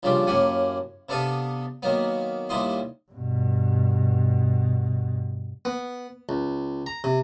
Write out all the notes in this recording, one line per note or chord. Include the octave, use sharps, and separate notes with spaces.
A#1 C#3 F3 G3 G4 C6
F#2 A2 A#3 G4 F#5 G#5
C3 B3 D4 A4 F5 D#6
D#3 F#3 A#3 B3
D#2 A#2 G3 E4 D#5 C6
G2 B2
B3
C#2
A#5
C3